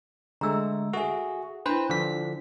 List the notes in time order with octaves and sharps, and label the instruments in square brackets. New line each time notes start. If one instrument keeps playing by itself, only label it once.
[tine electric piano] D3 G#3 A3 [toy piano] A#5 E6
[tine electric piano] F#4 G#4 [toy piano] A4 E5
[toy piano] D4 E4 [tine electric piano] B4 C5
[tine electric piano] D3 F3 B6